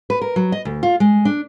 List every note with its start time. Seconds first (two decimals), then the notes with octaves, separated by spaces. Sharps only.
0.10 B4
0.22 A#4
0.36 F#3
0.52 D#5
0.65 D2
0.83 F4
1.00 G#3
1.25 D4